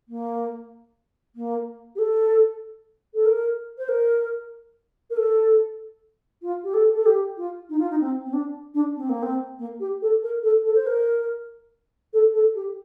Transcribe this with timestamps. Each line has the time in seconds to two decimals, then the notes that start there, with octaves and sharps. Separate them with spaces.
0.08 A#3
1.35 A#3
1.95 G4
1.99 A4
3.14 A4
3.25 A#4
3.78 C5
3.89 A#4
5.10 A#4
5.16 A4
6.42 F4
6.64 G4
6.74 A4
6.95 A4
7.06 G4
7.37 F4
7.70 D#4
7.79 F4
7.90 D#4
8.01 C4
8.25 C4
8.33 D4
8.74 D4
8.97 C4
9.09 A#3
9.23 C4
9.59 A#3
9.80 G4
10.02 A4
10.23 A#4
10.43 A4
10.65 A4
10.75 C5
10.87 A#4
12.13 A4
12.34 A4
12.55 G4